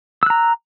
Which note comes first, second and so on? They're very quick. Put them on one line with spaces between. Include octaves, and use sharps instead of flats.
E6 F#6 A#5